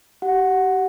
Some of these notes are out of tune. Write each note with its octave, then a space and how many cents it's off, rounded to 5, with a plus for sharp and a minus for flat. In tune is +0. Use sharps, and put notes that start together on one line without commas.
G4 -30 F#5 -5